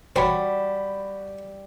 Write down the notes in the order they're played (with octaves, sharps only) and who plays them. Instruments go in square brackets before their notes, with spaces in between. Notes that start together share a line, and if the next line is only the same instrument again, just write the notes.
[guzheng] G3 [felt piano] F#4 B5 [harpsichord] C5 C#5